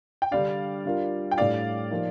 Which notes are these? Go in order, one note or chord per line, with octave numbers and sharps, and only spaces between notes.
G5
D3 G3 D4 D5 F5
G3 D4 F4 A#4
G5
A2 G3 D4 A4 D5 F5
F3 A#3 D#4